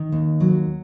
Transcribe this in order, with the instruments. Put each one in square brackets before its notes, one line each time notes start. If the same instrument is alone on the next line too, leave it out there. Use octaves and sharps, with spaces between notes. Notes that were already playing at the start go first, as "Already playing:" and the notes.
Already playing: [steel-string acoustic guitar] D#3
D#2
F#3